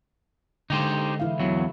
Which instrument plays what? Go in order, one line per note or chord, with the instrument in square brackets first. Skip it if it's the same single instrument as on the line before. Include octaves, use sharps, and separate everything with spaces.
[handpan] D3 G#3 [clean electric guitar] D#4 G4 C5
[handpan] E3 E4 F5
[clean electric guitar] E2 F#3